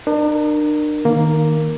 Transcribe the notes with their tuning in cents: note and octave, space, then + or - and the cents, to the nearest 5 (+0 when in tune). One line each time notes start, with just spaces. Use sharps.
D4 +40 A#4 +0
D#3 +0 A#3 +0